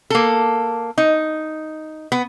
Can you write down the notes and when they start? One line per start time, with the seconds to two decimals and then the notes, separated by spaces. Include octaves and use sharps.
0.10 A#3 A4
0.98 D#4
2.12 B3